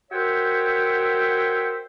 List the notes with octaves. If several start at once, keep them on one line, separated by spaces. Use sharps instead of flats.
F#4 A#4 C5 C#5 E5 G5